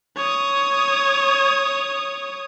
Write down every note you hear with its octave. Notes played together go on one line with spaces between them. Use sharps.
C#5 D#6